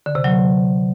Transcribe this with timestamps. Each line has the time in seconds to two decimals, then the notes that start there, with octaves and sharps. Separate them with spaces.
0.06 D3
0.15 C3
0.24 F#3